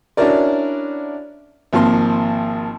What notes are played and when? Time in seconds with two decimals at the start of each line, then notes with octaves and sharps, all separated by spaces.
0.17 C#4 D4 E4 F#4 A#4 D5
1.73 G#1 F3 A#3 C6